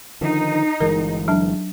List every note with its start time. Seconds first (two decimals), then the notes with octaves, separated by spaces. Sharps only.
0.21 D3 D#3 F3 D#4
0.80 G1 E3 G#3 A#4
1.28 F#3 D4 A5